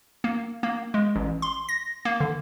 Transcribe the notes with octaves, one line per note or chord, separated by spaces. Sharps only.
A#3
A#3
G#3
A1
C6
A#6
A#3
D3